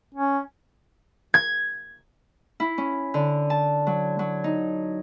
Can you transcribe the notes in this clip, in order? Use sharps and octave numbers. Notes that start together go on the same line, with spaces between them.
C#4
G#6
E4
C#4
D3
A5
F#3
F#3
D#4